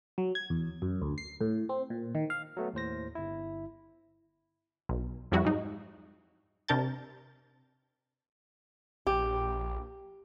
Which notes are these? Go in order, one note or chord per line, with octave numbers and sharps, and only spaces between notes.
F#3
G#6
E2
F#2
D2
C7
A2
C4
A#2
D#3
F5
F#3 A3 B3
D#2 A2 C5 A#6
G1 E4
B1
F2 F3 G3 E4 F#4
G#2 F#3 D#4
C3 D4 A#4 A5 G6 A6
A#1 G4